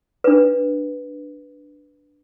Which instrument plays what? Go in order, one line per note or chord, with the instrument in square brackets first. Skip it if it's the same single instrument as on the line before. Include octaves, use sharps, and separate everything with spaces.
[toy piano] D4 B4